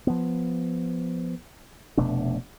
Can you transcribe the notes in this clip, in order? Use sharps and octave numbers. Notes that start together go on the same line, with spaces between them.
F3 B3
F1 B2 A3 D4